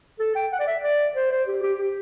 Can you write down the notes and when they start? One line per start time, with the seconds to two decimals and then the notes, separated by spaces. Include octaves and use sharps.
0.19 A4
0.35 G5
0.52 F#5
0.59 D5
0.67 E5
0.83 D5
1.16 C5
1.31 C5
1.47 G4
1.63 G4
1.79 G4